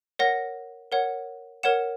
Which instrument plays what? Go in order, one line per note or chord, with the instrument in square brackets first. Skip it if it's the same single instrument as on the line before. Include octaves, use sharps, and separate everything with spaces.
[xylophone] A#4 C#5 F#5 A#6
A#4 C#5 F#5
A#4 C#5 F#5 E7